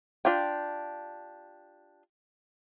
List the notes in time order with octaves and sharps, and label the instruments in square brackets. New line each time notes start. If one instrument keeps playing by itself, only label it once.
[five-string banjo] D4 F4 G4 G5